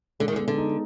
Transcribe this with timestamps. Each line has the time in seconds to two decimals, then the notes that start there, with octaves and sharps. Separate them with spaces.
0.20 D3 G#3
0.28 D#3
0.36 D3 B3
0.48 D3
0.57 D#4